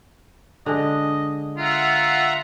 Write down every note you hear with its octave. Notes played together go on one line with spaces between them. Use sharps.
D3 G#3 D#5
F4 E5 F#5 A#5